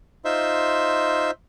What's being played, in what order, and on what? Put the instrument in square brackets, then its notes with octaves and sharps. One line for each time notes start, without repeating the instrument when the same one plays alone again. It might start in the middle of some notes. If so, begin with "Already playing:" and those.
[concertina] D#4 F4 C5 E5